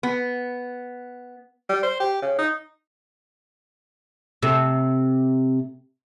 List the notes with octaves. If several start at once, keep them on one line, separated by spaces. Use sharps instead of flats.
B3
G3
C5
G4
C#3
D#4
C3 C4 A4